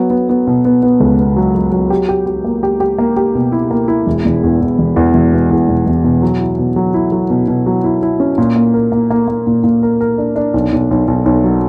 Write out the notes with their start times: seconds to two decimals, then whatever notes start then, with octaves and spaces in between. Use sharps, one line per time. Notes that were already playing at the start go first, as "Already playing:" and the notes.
Already playing: F#3 B3
0.10 B3
0.29 B3
0.47 B2
0.65 B3
0.83 B3
1.00 C#2
1.19 B3
1.36 F#3
1.55 F#3
1.72 F#3
1.90 G4
2.09 G4
2.26 G4
2.44 A#3
2.63 G4
2.80 G4
2.99 A#3
3.17 G4
3.35 B2
3.52 E4
3.71 A#3
3.88 E4
4.06 E1
4.25 E1
4.43 E2
4.61 E2
4.78 E1
4.96 E2
5.14 E1
5.33 B2
5.50 E2
5.68 E1
5.86 E1
6.04 B2
6.22 F#3
6.40 E4
6.59 B2
6.76 F#3
6.94 E4
7.12 F#3
7.30 B2
7.48 B2
7.66 F#3
7.84 E4
8.03 E4
8.20 C#4
8.38 A#2
8.56 A#3
8.74 A#4
8.92 A#3
9.10 A#3
9.28 A#3
9.47 A#2
9.64 A#2
9.83 A#4
10.01 A#4
10.18 D4
10.36 D4
10.54 B1
10.72 B1
10.91 B1
11.08 B1
11.26 B1
11.44 F#3